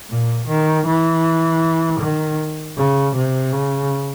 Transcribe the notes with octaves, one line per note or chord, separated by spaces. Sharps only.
A#2
D#3
E3
D#3
C#3
C3
C#3